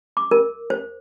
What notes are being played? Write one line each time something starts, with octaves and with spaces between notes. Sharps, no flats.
D6
A#4
C5